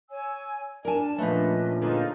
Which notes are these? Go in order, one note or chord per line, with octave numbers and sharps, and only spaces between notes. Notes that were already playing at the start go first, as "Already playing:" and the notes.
C#5 G#5 E6
D4 A#4 G#5 A5
A#2 F3 A3 C#4 D4 B4 D#5
D3 D#4 F4 G#4 B4 C5